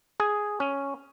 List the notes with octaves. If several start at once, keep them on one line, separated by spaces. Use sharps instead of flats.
G#4
C#4